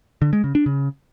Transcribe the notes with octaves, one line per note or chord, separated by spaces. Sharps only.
D3
G#3
C#3
D4
C#3